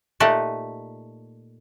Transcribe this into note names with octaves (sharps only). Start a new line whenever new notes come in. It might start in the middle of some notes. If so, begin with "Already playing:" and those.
A#2 A3 D#4 G4 F#5 A5